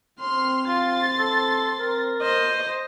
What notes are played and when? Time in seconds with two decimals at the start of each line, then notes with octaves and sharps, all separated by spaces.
0.20 C4 C6 F6
0.67 F4 C6 A6
1.19 A4
1.80 A#4
2.22 C5 D#5